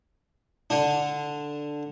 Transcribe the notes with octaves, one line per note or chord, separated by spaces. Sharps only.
D3 D4